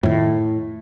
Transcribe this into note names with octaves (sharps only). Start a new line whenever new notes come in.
F2 A2 D#3